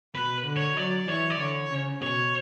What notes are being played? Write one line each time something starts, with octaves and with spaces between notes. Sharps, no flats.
B2 B4
D3
C#5
F#3 D5
E3 C#5
D5
D3 C#5
C#3
B2 C#5